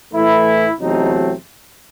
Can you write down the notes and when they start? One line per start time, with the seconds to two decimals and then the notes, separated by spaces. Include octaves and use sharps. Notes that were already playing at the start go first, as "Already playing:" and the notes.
0.13 A2 E3 A3 E4
0.79 E2 C3 F#3 A3 C4 D#4